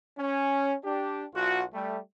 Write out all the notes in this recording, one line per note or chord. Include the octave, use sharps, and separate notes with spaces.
C#4
D4 G4
B1 F4 F#4
G3 A3